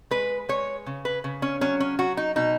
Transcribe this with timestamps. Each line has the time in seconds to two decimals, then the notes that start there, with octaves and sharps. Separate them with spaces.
0.11 G#3 B4
0.49 G#3 C#5
0.86 C#3
1.05 B4
1.24 C#3
1.42 C#4
1.61 F#3 C#4
1.80 C#4
1.99 F#3 F#4
2.17 D#4
2.36 B2 D#4